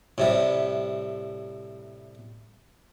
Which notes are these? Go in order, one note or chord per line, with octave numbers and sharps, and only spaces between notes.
A2 C3 G3